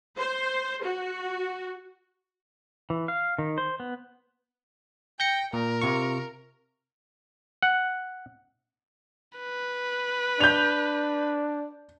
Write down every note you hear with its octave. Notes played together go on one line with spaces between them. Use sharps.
C5
F#4
E3
F5
D#3
C5
B3
G5 G6 A#6 C#7
A#2 A#4
C3 F4 C#6
F#5
B4
D4 G6 F7